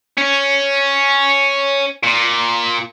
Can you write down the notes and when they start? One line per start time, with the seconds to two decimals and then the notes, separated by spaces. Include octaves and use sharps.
0.18 C#4
2.03 A#2